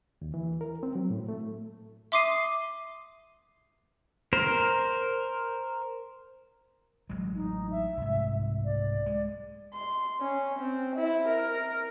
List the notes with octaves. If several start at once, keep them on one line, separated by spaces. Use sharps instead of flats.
D#2
E3
A#4
C4
F#3
A2
A3
E5 C6 D6 D#6 C7 D#7
A#4 C5
A1 F#3 G#3
D#4
E5
C2 G#2
D5
G#3
C6
C#4
C4
E4
A#4